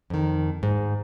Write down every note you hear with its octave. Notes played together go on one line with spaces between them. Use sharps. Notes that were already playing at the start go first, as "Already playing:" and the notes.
F2 D#3
G#2